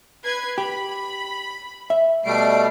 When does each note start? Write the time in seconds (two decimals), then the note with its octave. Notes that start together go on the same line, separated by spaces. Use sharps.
0.24 B4 G#6 C7
0.58 G4 B5
1.90 E5
2.25 B2 G3 A3 D5 C7 D7